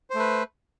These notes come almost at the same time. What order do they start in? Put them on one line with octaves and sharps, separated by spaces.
C5 A3 B4